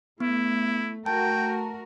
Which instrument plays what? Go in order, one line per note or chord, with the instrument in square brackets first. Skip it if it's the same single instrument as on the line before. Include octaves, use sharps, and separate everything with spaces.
[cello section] A3 [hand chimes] B3 [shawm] E4
[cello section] A3 F#4 A#4 [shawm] G5 [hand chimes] A5